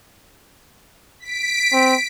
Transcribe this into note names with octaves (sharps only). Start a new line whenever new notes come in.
B6 D7
C4